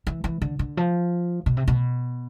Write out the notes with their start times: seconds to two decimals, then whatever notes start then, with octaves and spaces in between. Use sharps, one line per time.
0.07 E3
0.24 E3
0.42 D3
0.59 D3
0.77 F3
1.46 B2
1.57 C3
1.68 B2